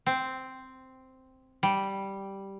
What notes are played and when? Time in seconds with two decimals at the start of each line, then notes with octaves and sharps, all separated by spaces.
0.06 C4
1.63 G3